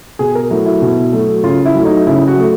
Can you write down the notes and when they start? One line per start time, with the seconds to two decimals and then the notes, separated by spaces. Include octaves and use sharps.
0.19 B2 G#4
0.35 A#4
0.50 F#3 A3 E4
0.66 E4
0.82 B2
1.13 F#3 A3
1.44 C#3 F4
1.66 E4
1.75 F#3 A3
1.85 D#4
2.07 C#3 E4
2.28 F#4
2.38 F#3 A3